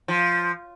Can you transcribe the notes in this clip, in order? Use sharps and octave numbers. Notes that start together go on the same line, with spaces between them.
F3